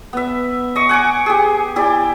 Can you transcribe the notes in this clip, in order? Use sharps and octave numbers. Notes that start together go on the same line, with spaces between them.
B3 E5
D#5 C#6
F#5 G#5 C#6 D6
G4 G#4
E4 G4 D5